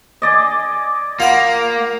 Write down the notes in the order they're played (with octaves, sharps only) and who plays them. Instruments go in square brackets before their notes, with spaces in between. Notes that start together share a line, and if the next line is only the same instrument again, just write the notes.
[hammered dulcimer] G#4 D5 D#5
[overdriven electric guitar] A#3 [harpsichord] F4 F#5 B5